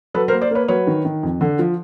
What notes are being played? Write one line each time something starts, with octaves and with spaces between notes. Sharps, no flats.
F#3 A4 B4
A#4 C5
A#3
C5 D5
A#3 B4 C#5
F#3 B4 C#5
D#3
D#3
F2
D3
F3